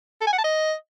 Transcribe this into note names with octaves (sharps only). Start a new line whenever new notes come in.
A4
G#5
F#5
A5
D#5